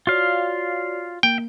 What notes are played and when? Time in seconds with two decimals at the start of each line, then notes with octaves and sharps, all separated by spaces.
0.07 F4 F#4 C#5 D5 F5
1.23 A#3 G5